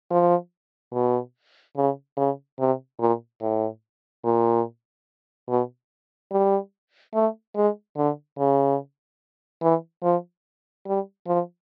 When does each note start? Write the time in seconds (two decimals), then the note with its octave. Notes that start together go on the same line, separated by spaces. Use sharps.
0.10 F3
0.93 B2
1.77 C#3
2.17 C#3
2.59 C3
3.00 A#2
3.41 A2
4.24 A#2
5.48 B2
6.32 G3
7.14 A3
7.56 G#3
7.97 D3
8.38 C#3
9.62 E3
10.03 F3
10.86 G3
11.27 F3